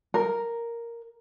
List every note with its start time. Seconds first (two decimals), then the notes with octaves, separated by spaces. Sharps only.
0.14 A#4